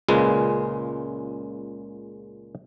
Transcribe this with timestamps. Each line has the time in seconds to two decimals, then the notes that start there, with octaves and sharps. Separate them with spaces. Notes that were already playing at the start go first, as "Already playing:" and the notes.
0.08 C#2 A#2 C#3 G#3 B4